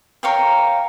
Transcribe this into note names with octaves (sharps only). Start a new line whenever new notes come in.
A#4 C#5 F5 G5